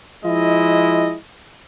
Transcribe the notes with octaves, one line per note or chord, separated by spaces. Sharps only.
F3 G#3 E4 D#5